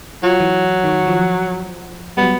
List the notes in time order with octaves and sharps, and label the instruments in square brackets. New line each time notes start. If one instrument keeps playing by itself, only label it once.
[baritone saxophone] F#3 [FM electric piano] F4
[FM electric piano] E3
D#3 C#6
F3
[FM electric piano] F#3 G3 [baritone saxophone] B3